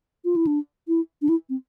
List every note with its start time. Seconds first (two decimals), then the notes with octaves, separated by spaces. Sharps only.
0.25 F4
0.36 E4
0.47 D4
0.88 E4
1.22 D4
1.29 E4
1.49 C4